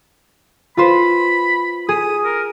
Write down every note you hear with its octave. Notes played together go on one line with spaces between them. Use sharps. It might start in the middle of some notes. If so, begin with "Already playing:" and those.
F4 B4 C5 B5
G#4 D#6
A#4